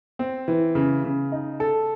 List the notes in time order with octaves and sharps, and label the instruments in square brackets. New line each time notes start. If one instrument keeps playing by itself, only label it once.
[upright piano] C4
E3
C#3
C#3
D#4
A4